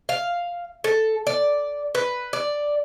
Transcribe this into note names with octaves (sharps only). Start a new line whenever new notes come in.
F5
A4
D5
B4
D5